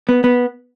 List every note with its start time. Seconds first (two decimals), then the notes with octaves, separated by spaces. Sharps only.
0.09 B3
0.24 B3